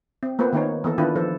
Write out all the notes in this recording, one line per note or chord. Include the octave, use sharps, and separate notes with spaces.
C4
A#3 B3 F4 B4 C5
D#3 A#3 D#4 A#4 C#5
E3 B3 A4
D#3 D4 E4 F4 B4
F3 A4 C5